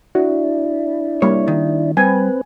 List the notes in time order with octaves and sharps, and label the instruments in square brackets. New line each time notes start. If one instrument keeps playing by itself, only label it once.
[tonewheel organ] D4 E4 [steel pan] F#4
[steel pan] G3 A#3 [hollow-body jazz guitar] C#5
[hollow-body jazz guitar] D#3
[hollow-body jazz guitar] G3 [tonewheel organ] C4 B4 [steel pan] G#5